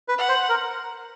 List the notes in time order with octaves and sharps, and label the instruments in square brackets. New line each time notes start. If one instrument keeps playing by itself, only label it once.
[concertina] B4
[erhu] F#5
[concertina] C5
A#4